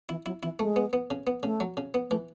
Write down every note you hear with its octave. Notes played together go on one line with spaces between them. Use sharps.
E3 E4
F#3 E4
E3 E4
G#3 A3
B3
B3
C#3
B3
C#3 A3
F#3
C#3
B3
E3 A3